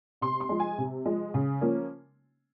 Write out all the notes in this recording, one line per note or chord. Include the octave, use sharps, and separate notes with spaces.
C3 C6
C6
F3 G#3
G#5
C3
F3 G#3
C#3
F3 A#3 C#4